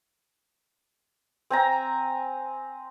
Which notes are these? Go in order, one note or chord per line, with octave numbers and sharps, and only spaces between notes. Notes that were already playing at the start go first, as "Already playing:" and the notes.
C4 G#5 A#5